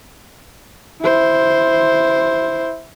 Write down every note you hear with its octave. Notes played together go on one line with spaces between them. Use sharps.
E4 C5